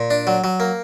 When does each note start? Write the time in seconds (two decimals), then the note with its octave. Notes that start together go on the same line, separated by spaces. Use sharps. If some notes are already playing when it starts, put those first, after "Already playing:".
Already playing: A#2
0.10 D4
0.27 F#3
0.44 F#3
0.60 A#3